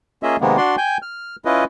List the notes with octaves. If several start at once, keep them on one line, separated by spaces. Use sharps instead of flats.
A#3 C#4 F4 G#4 D#5 E5
C3 D#3 G#3 A#3 B3
D4 F#4 D5 C6
G5 G#5 G6
F6
C#4 E4 F4 B4 D#5